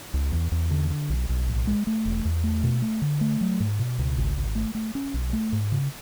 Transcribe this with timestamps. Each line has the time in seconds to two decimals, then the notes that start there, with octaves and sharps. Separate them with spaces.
0.14 C#2
0.32 E2
0.52 E2
0.71 D3
0.90 D3
1.10 B1
1.29 B1
1.47 A1
1.67 G#3
1.87 A3
2.05 E1
2.25 E2
2.43 A3
2.63 B2
2.82 A3
3.02 D3
3.21 A3
3.41 F#3
3.60 G#2
3.79 B2
3.99 C#2
4.18 G#1
4.36 G#1
4.55 A3
4.75 A3
4.95 C#4
5.14 B1
5.33 A3
5.52 G#2
5.72 C#3